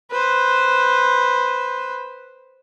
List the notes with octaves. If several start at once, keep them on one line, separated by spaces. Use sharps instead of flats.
B4 C5